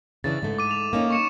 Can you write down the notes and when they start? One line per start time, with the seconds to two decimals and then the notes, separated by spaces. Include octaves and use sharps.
0.24 C#3 E3 D4 A6
0.42 G#2 A3
0.58 D6 D#7
0.71 F7
0.93 A#3 C#4 D#4
1.10 C#6 C#7 E7